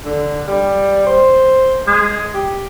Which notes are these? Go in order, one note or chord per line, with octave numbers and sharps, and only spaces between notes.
D3
G3
C5
G#3
G4